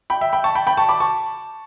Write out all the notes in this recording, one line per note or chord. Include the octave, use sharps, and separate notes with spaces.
G5 B5
E5 G5
G5 B5
A5 C#6
G5 B5
G5 B5
A5 C#6
B5 D6
A5 C#6